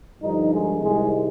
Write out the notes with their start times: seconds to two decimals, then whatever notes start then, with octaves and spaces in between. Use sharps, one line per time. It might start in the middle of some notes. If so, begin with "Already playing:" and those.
0.22 G2 D3 F3 D#4
0.51 G#3
0.80 C2 C3 D#3 G#3